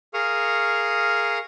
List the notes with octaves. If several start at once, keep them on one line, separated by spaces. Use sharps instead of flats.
G#4 A#4 F5 C#6 D#6 F6